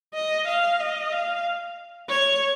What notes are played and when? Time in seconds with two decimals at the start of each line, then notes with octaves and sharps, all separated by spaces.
0.14 D#5
0.48 F5
0.80 D#5
1.12 F5
2.09 C#5